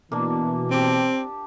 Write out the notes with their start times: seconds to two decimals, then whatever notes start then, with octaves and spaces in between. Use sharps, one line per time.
0.12 B2 E3 A#3 D4
0.71 C4 G4 A5